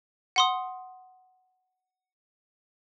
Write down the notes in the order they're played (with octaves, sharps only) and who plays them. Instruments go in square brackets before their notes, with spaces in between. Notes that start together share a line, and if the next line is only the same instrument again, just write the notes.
[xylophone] F#5 C6 D#6